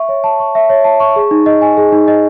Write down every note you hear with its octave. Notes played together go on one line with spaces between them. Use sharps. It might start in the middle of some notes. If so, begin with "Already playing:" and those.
Already playing: E5 C#6
C#5
A5
C#6
E5
C#5
A5
C#6
G#4
D#4
D#5
G#5
G#4
D#4
D#5